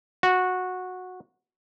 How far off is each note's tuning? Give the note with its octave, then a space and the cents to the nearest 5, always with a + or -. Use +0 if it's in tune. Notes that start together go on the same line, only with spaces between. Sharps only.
F#4 -15